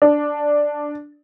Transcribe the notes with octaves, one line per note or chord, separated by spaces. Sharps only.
D4